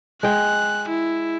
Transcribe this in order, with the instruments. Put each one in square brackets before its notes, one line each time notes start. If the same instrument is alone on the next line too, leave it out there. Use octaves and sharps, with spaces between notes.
[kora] G#3 G5 [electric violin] F#6
[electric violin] E4